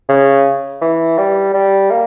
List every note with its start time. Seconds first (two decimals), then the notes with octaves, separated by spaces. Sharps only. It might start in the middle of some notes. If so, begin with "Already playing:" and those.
0.09 C#3
0.82 E3
1.18 G3
1.54 G3
1.91 A#3